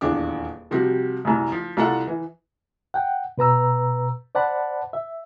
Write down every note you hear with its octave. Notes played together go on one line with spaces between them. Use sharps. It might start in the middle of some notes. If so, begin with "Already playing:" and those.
D#1 E2 D4 D6
C3 F3 G3 C4 F#4
C2 F#2
F3
C2 F4 A4 F#5
E3
F#5 G5
B2 B4 A#5 E6
C5 D5 F#5 A5 B5
E5